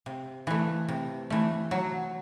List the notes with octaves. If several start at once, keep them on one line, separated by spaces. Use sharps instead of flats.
C3
E3 A3
C3
E3 A3
F#3